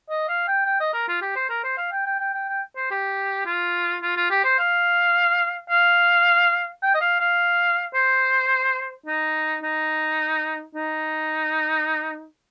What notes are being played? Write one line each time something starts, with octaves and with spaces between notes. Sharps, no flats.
D#5
F5
G5
G5
D#5
A#4
F4
G4
C5
A#4
C5
F5
G5
G5
G5
G5
G5
C5
G4
F4
F4
F4
G4
C5
F5
F5
G5
D#5
F5
F5
C5
D#4
D#4
D#4